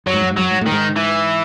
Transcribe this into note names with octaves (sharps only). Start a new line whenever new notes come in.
F#2 F#3
G#2
F#2
G#2
F#2 F#3
G#2
A2
D#3
G#2
E3